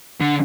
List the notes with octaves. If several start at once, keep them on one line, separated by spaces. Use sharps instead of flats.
D3